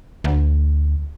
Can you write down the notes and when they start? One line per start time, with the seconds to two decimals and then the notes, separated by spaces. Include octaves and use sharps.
0.24 D2